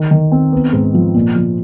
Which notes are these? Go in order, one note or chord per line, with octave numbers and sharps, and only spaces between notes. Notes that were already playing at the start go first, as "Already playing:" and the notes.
Already playing: D#3
D#3
C4
B3
G#2
F3
A#2
F3